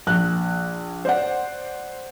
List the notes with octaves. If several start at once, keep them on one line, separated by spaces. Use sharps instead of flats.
A#1 F#6
C5 D5 F#5